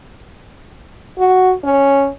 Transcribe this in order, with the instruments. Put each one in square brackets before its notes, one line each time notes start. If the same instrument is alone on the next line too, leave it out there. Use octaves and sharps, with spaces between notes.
[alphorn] F#4
C#4